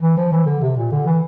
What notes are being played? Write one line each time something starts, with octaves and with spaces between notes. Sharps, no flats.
E3
F3
E3
D3
C3
A#2
D3
E3